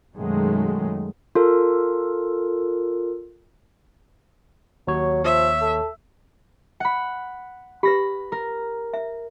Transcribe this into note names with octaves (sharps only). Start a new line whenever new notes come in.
F#2 B2 D#3 F#3 G#3 A3
F4 A4 A#4
D#2 F#3 C#5
F3 E5
A4
F#5 B5
G4 B4 B5 A#6
A#4
E5